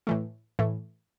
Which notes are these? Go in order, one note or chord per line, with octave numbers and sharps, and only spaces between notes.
A2 E3 A3
A2 E3 A3